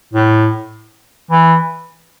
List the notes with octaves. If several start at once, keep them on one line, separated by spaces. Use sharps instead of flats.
A2
E3